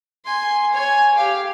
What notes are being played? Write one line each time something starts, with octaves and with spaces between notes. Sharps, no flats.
G#5 C6
C#5 G#5
G4 F5